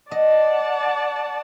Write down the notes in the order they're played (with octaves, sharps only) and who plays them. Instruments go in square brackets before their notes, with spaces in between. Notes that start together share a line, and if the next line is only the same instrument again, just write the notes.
[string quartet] D5 F#5 A5 [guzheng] D#5